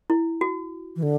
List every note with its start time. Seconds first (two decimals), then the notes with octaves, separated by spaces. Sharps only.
0.10 E4
0.41 F#4
0.96 E3
1.03 D3